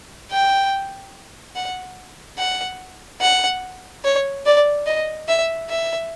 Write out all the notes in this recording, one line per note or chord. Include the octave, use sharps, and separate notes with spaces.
G5
F#5
F#5
F#5
C#5
D5
D#5
E5
E5